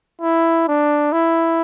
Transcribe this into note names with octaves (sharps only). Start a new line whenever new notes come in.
E4
D4
E4